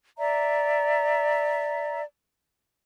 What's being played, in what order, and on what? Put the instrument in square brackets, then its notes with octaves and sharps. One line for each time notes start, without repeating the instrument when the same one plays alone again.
[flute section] D5 E5 A#5